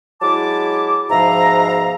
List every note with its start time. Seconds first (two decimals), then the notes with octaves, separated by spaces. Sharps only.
0.21 F#3 G#3 E4 A5 D6
1.10 G#2 B2 F3 E5 F5 A#5